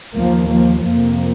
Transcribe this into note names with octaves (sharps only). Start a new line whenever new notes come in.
D#2 F3 A#3
F3 A#3
F2 C3 F3 A#3